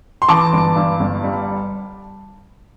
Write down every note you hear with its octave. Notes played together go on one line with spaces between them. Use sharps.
C6
E3 A5 D6
G1
G2
G1
G3